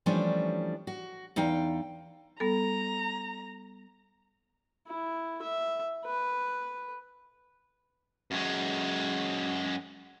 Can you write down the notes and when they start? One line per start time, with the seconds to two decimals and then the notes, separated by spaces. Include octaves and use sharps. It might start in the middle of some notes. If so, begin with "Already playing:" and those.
0.06 E3 F3 G3 A3 C#4 D4
0.87 F#4
1.36 E2 D#4 F5 G5
2.40 G3 B3 A4 A#5
4.88 E4
5.42 E5
6.05 B4
8.31 F#2 G#3